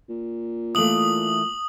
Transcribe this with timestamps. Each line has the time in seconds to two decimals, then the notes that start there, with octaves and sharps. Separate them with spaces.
0.09 A#2
0.75 E3 A3 A#3 D#6 F#7